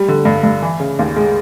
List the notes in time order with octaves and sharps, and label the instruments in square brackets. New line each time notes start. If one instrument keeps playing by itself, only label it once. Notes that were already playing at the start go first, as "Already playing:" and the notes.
Already playing: [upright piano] G3
D3
G2
G2
E3
C#3
D#2
G#3